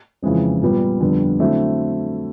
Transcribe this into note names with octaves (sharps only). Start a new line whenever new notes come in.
F2 C#3 E3 G#3 C4
A#2 G3 B3
F2 D3 G3 B3 D4
D3 F#3 A3 C4 E4